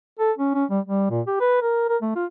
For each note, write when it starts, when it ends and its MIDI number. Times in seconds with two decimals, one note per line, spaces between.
0.20 0.32 69
0.38 0.52 61
0.55 0.65 61
0.70 0.80 55
0.85 1.10 55
1.11 1.21 46
1.27 1.36 67
1.41 1.61 71
1.62 1.85 70
1.89 1.97 70
2.02 2.11 57
2.16 2.25 65